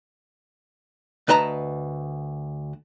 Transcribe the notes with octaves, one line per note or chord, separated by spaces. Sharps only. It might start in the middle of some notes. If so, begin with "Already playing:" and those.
D2 B4 D#5 A5 A#5